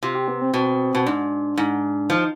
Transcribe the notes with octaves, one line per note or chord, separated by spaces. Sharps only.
C3 F4
G4
B3
C4
B2 C4
B2
G#2 D4
G#2
F3 D#4